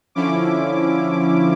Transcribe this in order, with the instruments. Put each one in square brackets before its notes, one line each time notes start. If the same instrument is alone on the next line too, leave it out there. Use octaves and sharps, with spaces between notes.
[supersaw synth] D3 F3 C#4 E4 D6